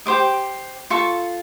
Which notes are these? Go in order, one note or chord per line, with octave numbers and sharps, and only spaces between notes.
G4 C5 D#5 D6
F4 A4 C#6